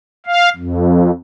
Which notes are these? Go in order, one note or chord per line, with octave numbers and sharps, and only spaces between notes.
F5
F2